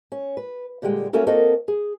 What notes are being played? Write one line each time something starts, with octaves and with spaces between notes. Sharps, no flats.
C#4
B4
A#2 D3 G3 G#3 G5
A3 A#3 C#4 F#4 A4 A#4
A#3 C4 F#4 A4 A#4 D#5
G#4